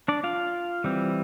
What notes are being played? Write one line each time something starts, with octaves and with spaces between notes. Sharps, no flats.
D4 D5
F4 F5
E3 G3 C4